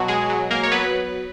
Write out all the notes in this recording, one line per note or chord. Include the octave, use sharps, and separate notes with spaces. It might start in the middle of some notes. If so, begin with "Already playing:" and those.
Already playing: B2 F#3 F#4
G#3 G#4
F#3
A#3 A#4
C#5
F#3 B3 B4